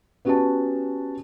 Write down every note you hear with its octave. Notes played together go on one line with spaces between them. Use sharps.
B3 C#4 F#4 G4 B4 A5